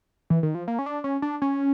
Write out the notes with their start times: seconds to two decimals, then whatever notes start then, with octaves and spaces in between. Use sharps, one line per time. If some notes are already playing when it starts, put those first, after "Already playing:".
0.30 E3
0.43 D#3
0.55 F3
0.68 A#3
0.79 C#4
0.86 D4
1.04 C#4
1.22 D4
1.42 C#4